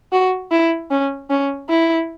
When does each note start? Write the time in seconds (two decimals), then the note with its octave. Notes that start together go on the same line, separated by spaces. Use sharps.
0.12 F#4
0.51 E4
0.91 C#4
1.30 C#4
1.69 E4